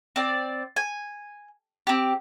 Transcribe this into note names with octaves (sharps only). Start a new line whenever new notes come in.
C4 D5
G#5
C4 G4